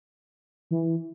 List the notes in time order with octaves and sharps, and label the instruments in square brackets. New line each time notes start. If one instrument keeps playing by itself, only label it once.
[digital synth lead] E3